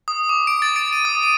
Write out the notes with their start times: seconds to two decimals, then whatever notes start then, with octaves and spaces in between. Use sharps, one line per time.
0.08 D#6
0.29 D6
0.47 D7
0.62 A6
0.76 D7
0.93 D#7
1.05 D#6
1.23 D#7